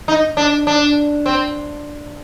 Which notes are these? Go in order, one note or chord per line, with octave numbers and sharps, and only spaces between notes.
D#4
D4
D4
C4